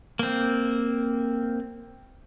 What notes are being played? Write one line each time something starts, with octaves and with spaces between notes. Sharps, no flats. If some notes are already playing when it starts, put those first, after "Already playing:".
A#3 C4